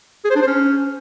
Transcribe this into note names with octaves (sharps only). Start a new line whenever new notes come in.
G#4
C5
D4
C5
C#4